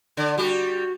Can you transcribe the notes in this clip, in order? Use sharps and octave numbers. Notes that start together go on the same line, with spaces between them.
D3 D5
G3 F#4 G4